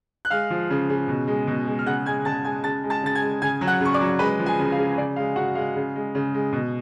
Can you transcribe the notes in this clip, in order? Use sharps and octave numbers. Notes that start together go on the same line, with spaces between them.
F#6
G#3 F5 F6
F3
C#3
C#3
B2
G#3
B2
G#3
F6
C#3 F#5 F#6
G#3 G#5 G#6
C#3 A5 A6
G#3 G#5 G#6
C#3 A5 A6
G#3
A5 A6
C#3 A6
G#5 G#6
G#3
C#3 G#5 G#6
F#3
F#5 F#6
C#3 C#6
D5 D6
F#3
G#3 B4 B5
F3
G#4 G#5
C#3
F5
C#3
C#3 D5
G#3 F5
C#3 F#4 F#5
G#3 F5
C#3
G#3
C#3
G#3
B2